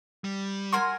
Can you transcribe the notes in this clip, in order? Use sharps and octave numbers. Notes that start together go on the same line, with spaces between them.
G3
F#4 A#4 G#5 C6